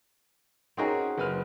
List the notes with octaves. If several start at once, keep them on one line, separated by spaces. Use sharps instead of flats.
C4 C#4 D#4 F#4 G#4 A#4
F#1 B4 F6